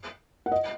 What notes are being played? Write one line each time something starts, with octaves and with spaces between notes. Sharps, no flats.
F#5
D#5